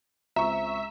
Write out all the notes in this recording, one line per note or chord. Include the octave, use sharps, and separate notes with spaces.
C#2 C4 E5 A#5 C#6